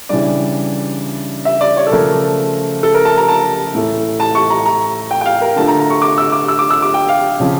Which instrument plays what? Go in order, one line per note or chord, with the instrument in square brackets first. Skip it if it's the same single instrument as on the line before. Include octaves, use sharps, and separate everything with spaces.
[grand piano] C#3 E3 G3 D4 [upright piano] D5
[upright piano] E5
D5
C#5
A4
[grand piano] C#3 F3 A3 [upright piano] A#4
[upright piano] A4
A#4
A5
A#5
A5
[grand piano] A2 E3 A3
[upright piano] A5
C#6
A#5
A#5
G5
G5
F5
A#4
[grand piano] D3 A3 D4 F4 [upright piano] A5
[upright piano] A#5
A#5
C#6
D6
E6
D6
E6
D6
E6
D6
G5
F5
[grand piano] C#3 F3 C#4